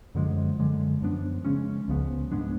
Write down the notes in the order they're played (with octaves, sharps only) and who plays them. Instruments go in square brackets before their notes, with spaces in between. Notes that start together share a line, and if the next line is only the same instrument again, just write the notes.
[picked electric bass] F#2 D3 F3 G#3
F#2 D3 G#3
F#2 F3 B3 D4
C#3 G#3 C#4
C#2 C#3 F3 B3
G#2 G#3 B3 D4